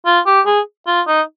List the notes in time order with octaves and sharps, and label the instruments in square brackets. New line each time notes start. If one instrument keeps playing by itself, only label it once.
[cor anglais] F4
G4
G#4
F4
D#4